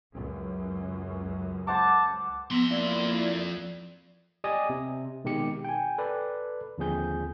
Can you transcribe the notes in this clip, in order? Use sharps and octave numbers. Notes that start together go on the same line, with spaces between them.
C#2 F#2
C5 F#5 A5 D6
F2 B3 A#5 C6 E6
A#3 E4 D5
G4 D5 D#5 G#5 D#6
C3
B2 D#3 G#3 C4 G4 C#7
G5 G#5
A4 B4 D5
D#2 D3 F3 C4 G#4 G6